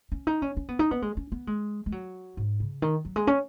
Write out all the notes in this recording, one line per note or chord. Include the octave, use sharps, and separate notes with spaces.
C#4
D#4
C#4
C#4
B3
D#4
B3
G#3
C#4
B3
G#3
G#3
F#3
G#2
C#3
D#3
F#3
G#3
C#4